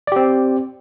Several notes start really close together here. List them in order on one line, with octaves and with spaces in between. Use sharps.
D5 G4 C4